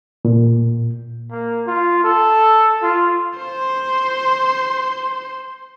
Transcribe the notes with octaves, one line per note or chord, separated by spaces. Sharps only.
A#2
A#3
F4
A4
F4
C5 C6